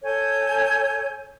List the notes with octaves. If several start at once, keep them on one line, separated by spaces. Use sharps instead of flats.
A4 C#5 G#5 G6